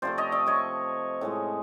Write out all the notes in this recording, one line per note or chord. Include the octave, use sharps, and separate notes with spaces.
C3 F3 A3 C5 D5
C#5 D#5
D5 E5
C#5 D#5
A2 F3 G#3